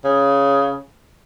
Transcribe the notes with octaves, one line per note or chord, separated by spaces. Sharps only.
C#3